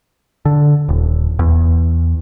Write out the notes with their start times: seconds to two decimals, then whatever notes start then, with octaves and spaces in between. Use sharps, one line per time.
0.45 D3
0.89 D#1
1.39 E2